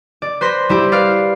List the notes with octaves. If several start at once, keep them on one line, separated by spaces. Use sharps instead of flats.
D5
B4 C5 C6 A#6 B6
G3 E4 G4
B4 D5 F5 F6